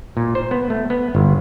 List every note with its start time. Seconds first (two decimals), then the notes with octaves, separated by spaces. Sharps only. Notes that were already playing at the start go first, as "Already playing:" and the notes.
0.17 A#2
0.35 C5
0.51 B3
0.70 A3
0.90 B3
1.15 G1